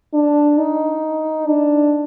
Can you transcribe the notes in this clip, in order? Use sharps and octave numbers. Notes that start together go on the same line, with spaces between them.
D4
D#4
D4